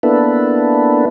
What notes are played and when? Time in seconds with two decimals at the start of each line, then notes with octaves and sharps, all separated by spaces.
0.03 A#3 B3 D4 E4 A4 B4